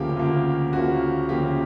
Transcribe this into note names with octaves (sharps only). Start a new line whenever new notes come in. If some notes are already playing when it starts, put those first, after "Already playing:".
Already playing: D2 C#3 F3 A#3 G4
D2 C#3 F3 A#3
D2 C#3 F3 A#3 F#4
D2 C#3 F3 A#3 G4